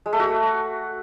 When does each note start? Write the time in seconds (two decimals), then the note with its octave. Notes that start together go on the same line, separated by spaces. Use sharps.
0.06 G#3
0.13 A3
0.20 F#4